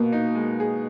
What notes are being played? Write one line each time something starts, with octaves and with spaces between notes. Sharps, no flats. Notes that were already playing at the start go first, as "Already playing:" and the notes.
Already playing: B2 A#3
D#4
G#3
G#4